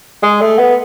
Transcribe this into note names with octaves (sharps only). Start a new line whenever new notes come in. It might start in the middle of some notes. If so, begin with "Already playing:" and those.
G#3
A3
B3